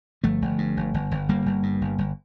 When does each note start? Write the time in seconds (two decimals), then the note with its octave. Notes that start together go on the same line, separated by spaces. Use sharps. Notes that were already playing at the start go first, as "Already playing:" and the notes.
0.23 G1 F3 A3
0.42 G1
0.58 G2
0.77 G1
0.94 G1
1.11 G1
1.29 G1 G3 A#3
1.46 G1
1.63 G2
1.81 G1
1.98 G1